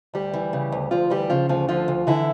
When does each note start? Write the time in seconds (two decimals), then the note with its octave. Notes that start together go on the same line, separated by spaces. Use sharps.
0.14 D2 G3 G4
0.34 E3
0.53 C#3
0.72 D2
0.91 D2 F3 F4
1.10 E3 G3 G4
1.30 C#3 F3 F4
1.49 D2 F3 F4
1.68 D3 F3 F4
1.88 D2
2.07 D3 E3 E4